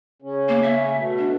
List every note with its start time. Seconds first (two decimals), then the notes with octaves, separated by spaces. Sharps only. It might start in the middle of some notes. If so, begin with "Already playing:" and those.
0.22 C#3 C#4
0.49 A#3
0.63 E5
0.95 B2 A3
1.18 D4